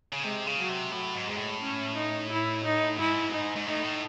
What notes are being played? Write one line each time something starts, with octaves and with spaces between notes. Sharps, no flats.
C#3
C3 G#3
C#3
F#3
C3
A2 F#3
G#2
G#2 G#3
A2
C#4
D#4
E4
D#4
G#2 E4
D#4
G#2
A2 D#4
A2